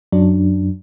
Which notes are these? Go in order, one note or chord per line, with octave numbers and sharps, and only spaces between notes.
F#2 F#3 D4